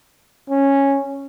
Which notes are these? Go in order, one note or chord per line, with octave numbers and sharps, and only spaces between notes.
C#4